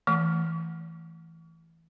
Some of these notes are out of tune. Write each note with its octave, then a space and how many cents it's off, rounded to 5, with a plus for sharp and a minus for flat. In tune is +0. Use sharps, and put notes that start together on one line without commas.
E3 +0 A3 +0